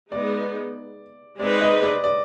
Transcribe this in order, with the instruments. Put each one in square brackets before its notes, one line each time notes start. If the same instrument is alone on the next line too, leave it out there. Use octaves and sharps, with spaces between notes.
[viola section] G#3 B3 D#4 [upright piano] D5
[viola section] G#3 C4 D#4 G#4 B4 [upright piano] D5
[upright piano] D#5
D5
D5